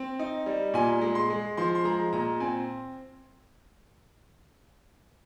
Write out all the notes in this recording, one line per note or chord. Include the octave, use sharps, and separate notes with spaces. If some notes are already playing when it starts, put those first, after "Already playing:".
Already playing: C4
D#4
G3
A#2 G#5
G#3
C6
G#3
F3 C6
C6
G#3 A#5
A#2 A#5
C4 G#5